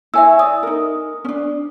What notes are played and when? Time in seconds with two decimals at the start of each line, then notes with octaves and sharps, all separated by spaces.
0.14 E4 C#5 E5 G#5 E6
0.39 D5 D#6
0.63 D#4 A#4
1.25 C#4 D4